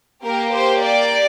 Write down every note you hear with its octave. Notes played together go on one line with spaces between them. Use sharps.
A#3 G4 A#4
C5
D5